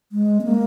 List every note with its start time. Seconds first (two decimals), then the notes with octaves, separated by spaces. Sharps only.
0.12 G#3
0.40 C4
0.44 A#3